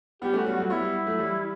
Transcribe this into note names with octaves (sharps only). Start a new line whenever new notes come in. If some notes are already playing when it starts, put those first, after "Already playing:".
G3 B3 G4
A3 C#4 F#4
G3 B3
F#3 A3 F#4
G3 B3 E4
G3 B3
F#3 A3
E3 G3